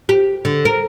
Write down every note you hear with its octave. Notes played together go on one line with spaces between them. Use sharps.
G4
D3
A#4